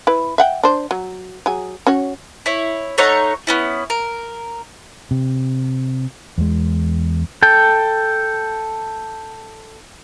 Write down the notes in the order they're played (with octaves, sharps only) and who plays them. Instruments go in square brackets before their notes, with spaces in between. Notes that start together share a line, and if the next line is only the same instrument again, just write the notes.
[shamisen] E4 B4
E5 F#5 G5
D4 C5
F#3
F#3 G#4
C#4 F#4 C#5
[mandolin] E4 C#5
A3 D#4 C#5 F#5
B3 C#4 E4
A#4
[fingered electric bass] C3
E2 G#3
[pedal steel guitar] A4 G5